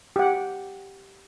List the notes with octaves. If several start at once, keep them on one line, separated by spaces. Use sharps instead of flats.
G4 F#5